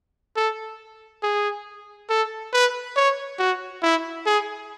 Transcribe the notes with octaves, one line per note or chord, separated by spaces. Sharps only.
A4
G#4
A4
B4
C#5
F#4
E4
G#4